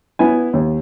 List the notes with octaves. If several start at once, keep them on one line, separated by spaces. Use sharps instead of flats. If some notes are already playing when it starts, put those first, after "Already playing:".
B3 E4 G#5
D#2